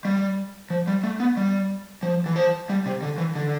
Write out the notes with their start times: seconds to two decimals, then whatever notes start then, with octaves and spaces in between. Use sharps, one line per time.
0.05 G3
0.70 F3
0.87 G3
1.04 A3
1.20 B3
1.37 G3
2.03 F3
2.26 E3
2.36 F3
2.69 G3
2.86 C3
3.03 D3
3.18 E3
3.35 D3